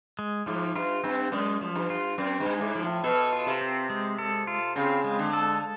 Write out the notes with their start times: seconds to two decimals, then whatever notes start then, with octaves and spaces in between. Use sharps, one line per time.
0.19 G#3
0.46 G#2 F3
0.75 G2 F4
1.04 G2 C4
1.32 F#2 G#3
1.61 F3
1.75 G2
1.90 F4
2.18 F#2 C4
2.40 G2
2.46 G#3
2.61 G#2
2.75 F3
2.83 A2
3.04 B2 A4
3.33 F4
3.47 C3
3.61 C4
3.90 G#3
4.18 A4
4.47 F4
4.76 C#3 C4
5.04 G#3
5.19 D3
5.33 A4